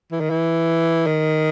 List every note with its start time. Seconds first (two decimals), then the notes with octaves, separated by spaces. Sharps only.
0.12 E3
0.20 D#3
0.30 E3
1.07 D#3